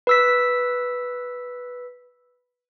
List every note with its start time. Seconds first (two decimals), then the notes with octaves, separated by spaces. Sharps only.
0.07 B4 E6 B6